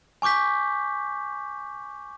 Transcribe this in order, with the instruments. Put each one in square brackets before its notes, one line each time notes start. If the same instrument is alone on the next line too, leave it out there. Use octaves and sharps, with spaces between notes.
[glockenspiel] G#5 C#6 D6 G6 B6